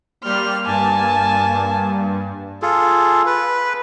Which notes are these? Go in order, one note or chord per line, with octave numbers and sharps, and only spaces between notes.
G3 A#3 C6 F6
G2 G#5 A5
F4 G#4 A4
B4